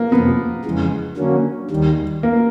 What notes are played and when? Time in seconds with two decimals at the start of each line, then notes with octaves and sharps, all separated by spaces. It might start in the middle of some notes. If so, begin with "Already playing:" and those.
Already playing: A#3
0.11 F2 C3 F3 B3
0.65 F2 C#3 E3 G#3
1.17 D3 F#3 A#3 C#4
1.71 D#2 D#3 G3
2.23 A#3